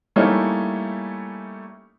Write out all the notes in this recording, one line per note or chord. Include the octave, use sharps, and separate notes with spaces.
G3 A3 A#3 C#4 D#4 E4